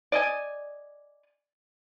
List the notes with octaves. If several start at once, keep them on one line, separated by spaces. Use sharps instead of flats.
D5 D#5 G#5